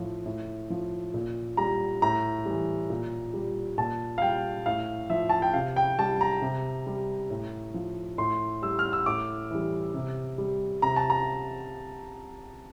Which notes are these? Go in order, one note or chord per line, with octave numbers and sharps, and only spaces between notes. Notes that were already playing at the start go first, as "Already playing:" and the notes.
Already playing: A2 F3
A2
F3
A#2
G3 A#5
A2 A#5
E3 G3
A#2
G3
A#2 A5
F5
G3 G5
A2 F5
F3 E5
A5
G5
C3 F5
G5
G3 A5
A#5
C3
G3
A2
F3
A2 C6
G3 E6
F6
E6
A2 D6
E3 G3
C3
G3
C3 A#5
A5
A#5